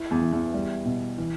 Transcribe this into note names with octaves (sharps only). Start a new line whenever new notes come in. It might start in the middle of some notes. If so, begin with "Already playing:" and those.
Already playing: E4 B4
E2
E3
E2
G3
B2
E3